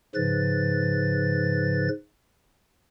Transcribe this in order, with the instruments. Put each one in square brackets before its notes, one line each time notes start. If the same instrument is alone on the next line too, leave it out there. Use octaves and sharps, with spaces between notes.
[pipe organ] G#2 C#3 F3 B4 A6